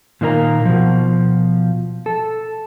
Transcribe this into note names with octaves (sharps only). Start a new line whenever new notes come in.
A#2 D#3 A#3 D#4 A#4 A#5
B2 F3
A4